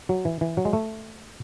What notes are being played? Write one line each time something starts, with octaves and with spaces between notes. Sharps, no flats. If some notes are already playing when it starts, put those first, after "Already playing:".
F#3
E3
E3
F#3
G#3
A3